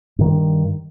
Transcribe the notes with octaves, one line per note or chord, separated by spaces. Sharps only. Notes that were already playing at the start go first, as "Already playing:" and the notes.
G2 D#3